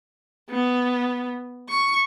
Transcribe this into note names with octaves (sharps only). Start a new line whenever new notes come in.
B3
C#6